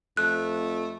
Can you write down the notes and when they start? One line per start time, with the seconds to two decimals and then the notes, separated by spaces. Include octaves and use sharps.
0.17 F2 A3 F#6